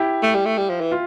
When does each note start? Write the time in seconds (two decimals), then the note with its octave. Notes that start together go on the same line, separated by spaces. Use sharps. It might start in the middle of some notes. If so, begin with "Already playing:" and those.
Already playing: E4 G4
0.23 A3
0.35 G3
0.45 A3
0.58 G3
0.70 F3
0.81 E3
0.92 F4